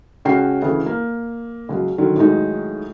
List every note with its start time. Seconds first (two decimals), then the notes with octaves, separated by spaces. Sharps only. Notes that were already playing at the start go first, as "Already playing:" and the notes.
0.25 C#2 C#4 F#4 G5 C7
0.62 D2 C#3 E3
0.86 A#3
1.69 C#2 F#3
1.98 D3 D#3 F#3
2.16 A2 D#3 F#3 G#3 D#4